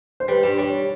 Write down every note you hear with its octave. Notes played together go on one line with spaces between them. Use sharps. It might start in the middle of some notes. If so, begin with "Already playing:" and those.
C5
G3 B4
G2
G3 C#5